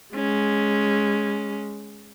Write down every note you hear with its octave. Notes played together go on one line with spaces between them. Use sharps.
G#3 C#4